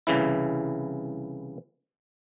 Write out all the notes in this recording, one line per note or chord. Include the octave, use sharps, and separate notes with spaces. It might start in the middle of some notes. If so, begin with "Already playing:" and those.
C2 C#3 E3 E4